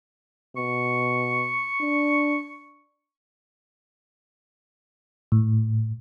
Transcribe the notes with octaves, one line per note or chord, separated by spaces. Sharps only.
B2 C#6
D4
A2